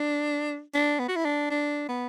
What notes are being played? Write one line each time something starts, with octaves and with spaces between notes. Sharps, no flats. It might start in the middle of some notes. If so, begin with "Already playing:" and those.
Already playing: D4
D4
B3
F#4
E4
D4
D4
B3